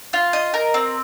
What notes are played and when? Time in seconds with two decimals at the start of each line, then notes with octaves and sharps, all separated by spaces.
0.13 F4
0.33 D#5
0.54 A#4
0.74 C4